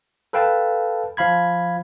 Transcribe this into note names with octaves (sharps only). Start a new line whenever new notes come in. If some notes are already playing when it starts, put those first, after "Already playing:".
A4 B4 F5 G5 A5
F3 F5 B5 G#6